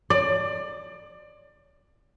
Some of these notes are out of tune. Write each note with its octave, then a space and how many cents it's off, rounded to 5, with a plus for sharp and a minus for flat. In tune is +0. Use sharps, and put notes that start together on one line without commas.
D5 +25